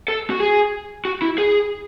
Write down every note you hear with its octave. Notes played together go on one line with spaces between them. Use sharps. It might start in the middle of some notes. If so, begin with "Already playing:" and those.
A4
F#4
G#4
F#4
E4
G#4